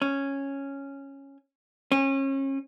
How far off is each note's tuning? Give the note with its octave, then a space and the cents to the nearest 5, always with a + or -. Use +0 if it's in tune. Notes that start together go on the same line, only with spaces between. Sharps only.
C#4 -5
C#4 -30